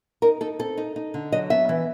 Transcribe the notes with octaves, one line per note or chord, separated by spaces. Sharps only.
D#4 A#4
D#4 A4
C4 A4
D#4
D#4
D3
F#3 D#5
B3 E5
E3